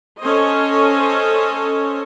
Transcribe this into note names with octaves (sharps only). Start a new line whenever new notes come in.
C#4 A4 C5 C#5 D#5